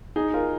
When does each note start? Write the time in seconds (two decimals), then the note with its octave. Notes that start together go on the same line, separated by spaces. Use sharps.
0.16 D#4 G#4
0.34 F4 A#4